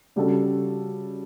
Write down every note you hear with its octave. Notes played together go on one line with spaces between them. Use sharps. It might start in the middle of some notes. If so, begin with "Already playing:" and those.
C#3 G3 D4 F#4 A4